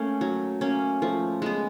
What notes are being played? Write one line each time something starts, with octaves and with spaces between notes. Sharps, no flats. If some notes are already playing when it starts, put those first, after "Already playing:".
Already playing: A3 A#3 C#4
F#3
A#3 C#4
F3 A3
G#3 B3